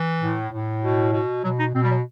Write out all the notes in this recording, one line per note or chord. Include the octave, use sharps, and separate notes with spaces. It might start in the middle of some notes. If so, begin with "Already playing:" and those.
Already playing: E3
A2
A2
B2
B2
B2 F#3
D#4
B2 C4
G3
F#3